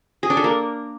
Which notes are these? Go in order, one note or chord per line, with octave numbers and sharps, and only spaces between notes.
G#4
D4
A4
A#3